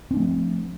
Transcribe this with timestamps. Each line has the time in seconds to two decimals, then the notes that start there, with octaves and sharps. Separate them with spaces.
0.11 C4
0.14 D4
0.17 A3
0.20 F3